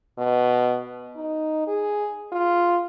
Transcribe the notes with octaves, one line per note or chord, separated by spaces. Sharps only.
B2
D#4
G#4
F4